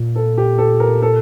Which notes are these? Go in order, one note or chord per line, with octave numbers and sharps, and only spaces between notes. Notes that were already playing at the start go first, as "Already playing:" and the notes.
Already playing: A#2 F4
A4
G4
A4
A#4
A4